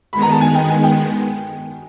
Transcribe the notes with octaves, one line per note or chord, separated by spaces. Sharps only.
D#3 G#3 B3 B5
A#5
A5
G#5
G5
G#5
G5